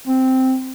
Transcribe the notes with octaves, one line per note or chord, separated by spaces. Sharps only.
C4